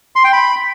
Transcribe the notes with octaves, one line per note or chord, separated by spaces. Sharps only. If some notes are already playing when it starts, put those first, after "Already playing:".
C6
G5
B5